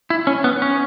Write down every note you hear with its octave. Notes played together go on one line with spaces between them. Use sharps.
E4
C#4
B3
C#4